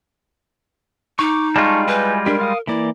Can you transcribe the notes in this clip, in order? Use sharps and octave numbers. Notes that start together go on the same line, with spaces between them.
D#4 C#6 D6
G3 G#3 F4 A5 C#6
E4 B4 G#5 G6
D4 G4 A#4
F5 D#6
E3 A#3 E4 D5